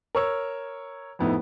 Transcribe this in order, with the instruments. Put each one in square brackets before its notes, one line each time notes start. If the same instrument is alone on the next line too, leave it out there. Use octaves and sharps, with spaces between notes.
[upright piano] A#4 C#5 E6
F2 A2 B3 D#4 E4